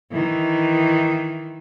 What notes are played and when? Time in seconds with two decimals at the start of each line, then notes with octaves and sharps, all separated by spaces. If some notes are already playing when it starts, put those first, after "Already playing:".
0.11 D#3 E3